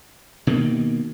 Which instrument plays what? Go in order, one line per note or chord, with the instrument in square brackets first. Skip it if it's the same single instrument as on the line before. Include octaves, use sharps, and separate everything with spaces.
[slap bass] B2 D#3 A#3